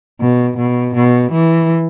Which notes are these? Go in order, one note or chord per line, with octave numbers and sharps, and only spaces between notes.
B2
B2
B2
E3